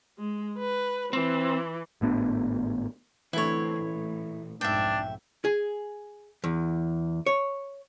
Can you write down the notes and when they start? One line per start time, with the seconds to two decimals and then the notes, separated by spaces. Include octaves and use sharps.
0.18 G#3
0.58 B4
1.13 E3 C4
2.01 G#1 A2 B3 D4
3.33 D3 E3 A3 C4 E4 C#5
3.79 A1 A#2
4.61 B1 F2 G#2 D4 E5 G5
5.45 G#4
6.44 E2
7.26 C#5